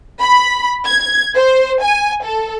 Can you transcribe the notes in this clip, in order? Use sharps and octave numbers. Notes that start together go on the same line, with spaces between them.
B5
G#6
C5
G#5
A4